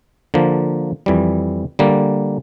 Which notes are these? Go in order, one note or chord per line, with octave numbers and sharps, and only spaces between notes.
D3 F3 A#3
F2 E3 G3
D3 G3 A#3